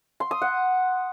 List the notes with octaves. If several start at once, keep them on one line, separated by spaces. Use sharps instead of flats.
C6
D#6
F#5